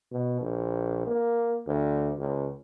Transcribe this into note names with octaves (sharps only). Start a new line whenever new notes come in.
B2
A#1
A#3
D2
C#2